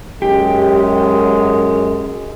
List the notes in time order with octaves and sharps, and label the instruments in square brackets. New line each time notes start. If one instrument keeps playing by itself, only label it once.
[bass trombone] F#2 [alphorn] G#3 [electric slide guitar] G4